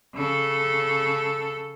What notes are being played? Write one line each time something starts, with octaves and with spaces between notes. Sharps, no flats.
C#3 A4